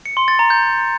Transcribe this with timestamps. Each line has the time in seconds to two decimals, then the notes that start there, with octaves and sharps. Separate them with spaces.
0.06 C#7
0.17 C6
0.28 A6
0.39 A#5
0.50 G6